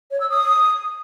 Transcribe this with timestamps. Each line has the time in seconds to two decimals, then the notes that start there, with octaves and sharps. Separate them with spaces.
0.11 C#5
0.20 E6
0.30 D#6